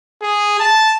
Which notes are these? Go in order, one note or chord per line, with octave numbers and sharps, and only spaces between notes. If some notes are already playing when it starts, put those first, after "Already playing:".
G#4
A5